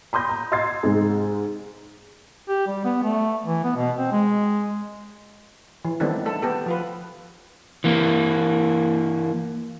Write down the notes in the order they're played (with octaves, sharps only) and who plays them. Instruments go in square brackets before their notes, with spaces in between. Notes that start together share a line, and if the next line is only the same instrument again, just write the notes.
[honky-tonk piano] B5 C6 D#6 G6 A#6
A#5
D#5 C6 E6 G#6 A6 C7
G#2 C3 G#3
[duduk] G4
G3
B3
A3
E3
B3
B2
C4
G#3
[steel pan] E3
D#3 G3 A3 B3 C4 D4
A3 A4
B3 G4 A4
F3 F4 B4
[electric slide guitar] E3 A#3